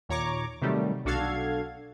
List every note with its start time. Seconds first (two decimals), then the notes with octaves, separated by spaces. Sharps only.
0.09 D#2 A#2 C#5 A#5 C#6 D6
0.62 C3 D#3 F#3 G3 A3
1.05 B1 D4 F#4 A4 F5 G#6